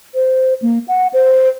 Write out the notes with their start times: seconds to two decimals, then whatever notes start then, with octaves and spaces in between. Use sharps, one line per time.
0.15 C5
0.62 A#3
0.88 F#5
1.13 C5